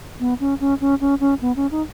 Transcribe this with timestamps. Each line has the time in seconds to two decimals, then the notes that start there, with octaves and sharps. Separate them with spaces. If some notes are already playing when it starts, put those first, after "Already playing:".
0.20 B3
0.40 C#4
0.60 C#4
0.81 C#4
1.01 C#4
1.20 C#4
1.42 B3
1.56 C#4
1.71 D#4